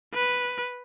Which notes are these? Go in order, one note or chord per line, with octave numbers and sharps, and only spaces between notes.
B4